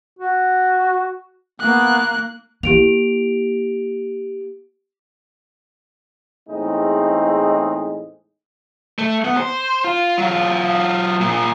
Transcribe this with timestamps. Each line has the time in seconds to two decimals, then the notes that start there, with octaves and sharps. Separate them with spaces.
0.19 F#4
1.60 A#3 B3 F#6
2.63 A#3 E4 G4 D7 F7
6.48 E2 A2 G#3 C4 D#4
8.99 A3
9.25 B3
9.37 C5
9.84 F4
10.18 F#3 F4
11.21 A#2 F3